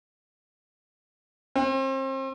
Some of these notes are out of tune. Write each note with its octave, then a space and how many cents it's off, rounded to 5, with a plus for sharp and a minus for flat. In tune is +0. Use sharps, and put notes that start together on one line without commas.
C4 +35